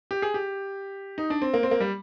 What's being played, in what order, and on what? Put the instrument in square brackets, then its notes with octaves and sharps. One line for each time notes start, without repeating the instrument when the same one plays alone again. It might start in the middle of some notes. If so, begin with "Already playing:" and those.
[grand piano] G4
G#4
G4
D#4
D4
C4
A#3
C4
A#3
G3